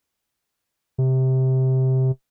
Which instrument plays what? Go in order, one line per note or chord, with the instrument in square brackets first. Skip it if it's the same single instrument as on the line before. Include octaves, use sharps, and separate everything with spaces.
[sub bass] C3